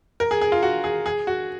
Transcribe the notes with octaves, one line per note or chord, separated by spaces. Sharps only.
A#4
G#4
G#4
F4
F#4
G#4
G#4
F#4